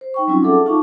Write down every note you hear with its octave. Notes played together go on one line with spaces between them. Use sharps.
C5
D#4 G5 C#6
F#3 G3 C4 C#4 E4 F4
G#4 A4 E5 F#5 A5 D6
D#4 F4 F5 A5 C#6 D6